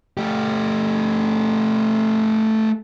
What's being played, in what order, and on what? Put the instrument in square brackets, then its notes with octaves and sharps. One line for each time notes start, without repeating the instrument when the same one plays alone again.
[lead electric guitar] A3 G4